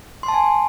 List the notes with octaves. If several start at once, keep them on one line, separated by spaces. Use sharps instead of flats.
C6
A5
G#5